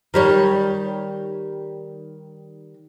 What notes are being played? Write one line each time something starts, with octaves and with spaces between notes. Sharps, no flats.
D#3 G3 C#5